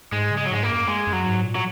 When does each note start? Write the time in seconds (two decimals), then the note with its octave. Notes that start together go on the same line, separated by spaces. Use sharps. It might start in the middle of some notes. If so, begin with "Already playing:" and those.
0.12 G#2 G#3
0.31 C#3
0.37 G#3
0.45 F#3
0.51 G#2 G#3
0.63 A#3
0.69 F#2
0.88 G#3
1.07 F#2
1.13 F#3
1.26 G#2
1.44 A#2
1.55 F#3